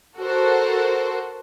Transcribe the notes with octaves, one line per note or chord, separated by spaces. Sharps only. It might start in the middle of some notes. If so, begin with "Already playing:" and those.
F#4 A4 A#4 C5